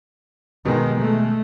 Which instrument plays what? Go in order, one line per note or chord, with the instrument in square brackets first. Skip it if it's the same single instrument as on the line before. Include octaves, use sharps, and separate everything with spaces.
[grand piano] B2 G#3 [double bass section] D#3
[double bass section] A3